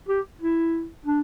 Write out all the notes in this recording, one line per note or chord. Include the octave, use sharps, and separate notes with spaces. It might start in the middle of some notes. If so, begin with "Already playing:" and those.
G4
E4
D4